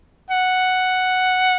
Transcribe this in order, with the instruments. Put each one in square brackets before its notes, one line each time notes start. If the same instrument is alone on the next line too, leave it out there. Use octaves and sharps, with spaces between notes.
[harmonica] F#5